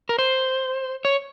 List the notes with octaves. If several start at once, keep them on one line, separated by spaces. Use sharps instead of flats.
A#4
C5
C#5